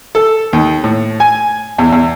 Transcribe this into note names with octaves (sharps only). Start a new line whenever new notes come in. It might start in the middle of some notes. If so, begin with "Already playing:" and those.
A4
D#2
A2
G#5
E2
E2